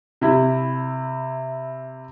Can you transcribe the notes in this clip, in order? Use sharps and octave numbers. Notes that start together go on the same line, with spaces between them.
C3 E4